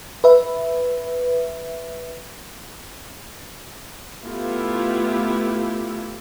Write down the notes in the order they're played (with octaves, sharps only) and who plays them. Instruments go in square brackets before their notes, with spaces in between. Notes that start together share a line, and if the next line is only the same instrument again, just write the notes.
[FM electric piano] B4 E5
[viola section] A3 B3 E4 F4 G4